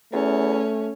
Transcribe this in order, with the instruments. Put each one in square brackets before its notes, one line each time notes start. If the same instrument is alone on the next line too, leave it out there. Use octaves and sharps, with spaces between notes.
[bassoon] E2 [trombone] A3 [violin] C#4